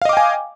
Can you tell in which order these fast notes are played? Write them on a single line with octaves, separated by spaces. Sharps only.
F5 D#5 D6 G5 G#5